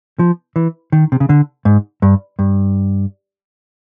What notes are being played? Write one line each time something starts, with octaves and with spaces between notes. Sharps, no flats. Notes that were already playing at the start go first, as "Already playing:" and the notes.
F3
E3
D#3
C3
C#3
D3
G#2
G2
G2